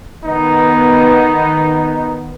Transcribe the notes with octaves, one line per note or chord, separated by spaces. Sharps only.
D#3 B3 D#4